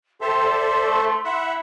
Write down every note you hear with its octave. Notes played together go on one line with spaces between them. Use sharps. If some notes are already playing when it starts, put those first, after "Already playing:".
G4 A4 C5 E5 C6
D5
A3
E4 E5 F#5